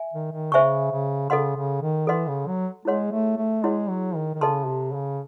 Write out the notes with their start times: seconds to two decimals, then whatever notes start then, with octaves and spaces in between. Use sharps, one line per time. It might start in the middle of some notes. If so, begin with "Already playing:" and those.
Already playing: E5 G#5
0.13 D#3
0.32 D#3
0.52 C#3 C5 E5 G#5 C#6
0.91 C#3
1.30 C#3 A4 D#5 F#5 C6
1.56 C#3
1.82 D#3
2.07 E3 A4 D#5 F#5 C6
2.27 C#3
2.47 F#3
2.85 G#3 E4 G#4 C#5 F#5 C6
3.12 A3
3.37 A3
3.64 G#3 E4 G#4 C#5 F#5 C6
3.89 F#3
4.15 D#3
4.35 D#3
4.41 C#3 A4 D#5 A5 C6
4.67 C3
4.93 C#3